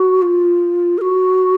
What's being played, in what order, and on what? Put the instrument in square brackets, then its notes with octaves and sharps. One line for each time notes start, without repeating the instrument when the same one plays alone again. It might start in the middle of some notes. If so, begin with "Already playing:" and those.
Already playing: [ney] F#4
F4
A#4
F#4